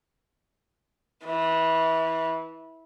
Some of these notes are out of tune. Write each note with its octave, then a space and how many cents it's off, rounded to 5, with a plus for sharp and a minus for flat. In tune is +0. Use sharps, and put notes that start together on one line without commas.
E3 -20